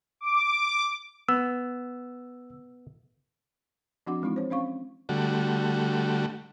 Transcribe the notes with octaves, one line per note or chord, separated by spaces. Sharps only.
D6
B3 E6
F3 C4 D4 F#4 F#5 D6
E3 G#3 C4 D#4 E4
C5 C#5
C4 C#4 F5 C#6
D3 G3 A3 F#4